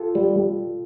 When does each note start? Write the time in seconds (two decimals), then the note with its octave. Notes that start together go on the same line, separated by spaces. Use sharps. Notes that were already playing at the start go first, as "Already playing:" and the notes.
Already playing: F4 A4
0.15 G3